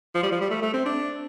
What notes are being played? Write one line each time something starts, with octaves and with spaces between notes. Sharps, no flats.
F3
G3
F3
G3
A3
A3
C4
D4